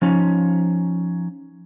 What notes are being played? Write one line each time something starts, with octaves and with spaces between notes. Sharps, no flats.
F3 C#4 D#4